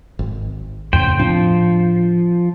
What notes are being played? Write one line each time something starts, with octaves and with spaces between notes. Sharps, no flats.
G#1
F2 A2 C#3 C5 G5
A2 F3 C4 D4